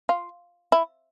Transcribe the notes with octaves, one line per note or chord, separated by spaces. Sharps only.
F4
E4